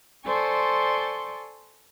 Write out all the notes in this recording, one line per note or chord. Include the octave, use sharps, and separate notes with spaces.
A4 C5 D5 G#5 C6 C#6